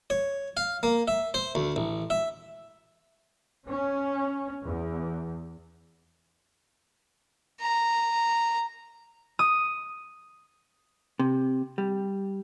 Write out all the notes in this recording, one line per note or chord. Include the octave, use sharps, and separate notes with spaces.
C#5
F5
A#3
E5
C5
D2
A1
E5
C#4
E2
A#5
D#6
C3
G3